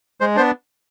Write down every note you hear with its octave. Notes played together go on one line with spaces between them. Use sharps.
G#3 C5
B3 D4 C5